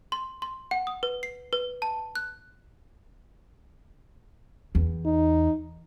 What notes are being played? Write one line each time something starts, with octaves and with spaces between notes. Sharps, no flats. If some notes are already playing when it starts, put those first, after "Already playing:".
C6
C6
F#5
D#6
B4
C7
B4
A5
F#6
E2
D#4